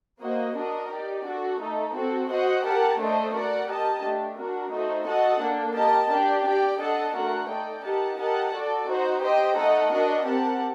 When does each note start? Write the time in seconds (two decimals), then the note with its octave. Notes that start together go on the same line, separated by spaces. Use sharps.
0.21 A#3 F#4 C5 D#5
0.56 D4 F#4 A#4 D#5
0.90 D#4 G4 D5
1.25 D4 F#4 A4
1.60 A3 D#4 A4
1.94 C4 F#4 A4
2.30 F#4 C5 D#5 F#5
2.64 G4 A#4 F#5 A5
2.98 A3 D4 A4 C5 D#5
3.33 F#4 A#4 D5 F#5
3.67 G4 A#4 D#5 A5
4.02 A3 D4 G4
4.37 D4 F#4 A#4
4.72 A3 D#4 F#4 A4 C5
5.06 F#4 A4 D#5 F#5 A5
5.40 A#3 D4 A4
5.75 G4 A#4 D#5 A5
6.10 D4 G4 D5
6.45 G4 D5 G5
6.79 D4 A4 D#5 F#5 A5
7.14 A3 D4 F#4 A#4 F#5
7.49 D#4 A4 D5 G5
7.83 D#4 G4 A#4 F#5 A5
8.18 G4 A#4 D#5 F#5 A5
8.53 F#4 A4 D5
8.87 D#4 F#4 C5
9.21 G4 C5 D#5 G5
9.56 A3 D#4 A4 D#5 F#5
9.91 D4 F#4 A#4 D#5 F#5
10.25 C4 G4 A#4 F#5 A5